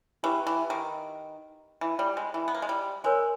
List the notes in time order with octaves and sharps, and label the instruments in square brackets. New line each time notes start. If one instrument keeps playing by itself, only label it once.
[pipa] E3 [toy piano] E4 G4 B4 G5
[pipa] E3
D#3
E3
G3
G#3
E3
B3
A#3
G#3
G3
[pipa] G#3 [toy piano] A#4 C#5 G#5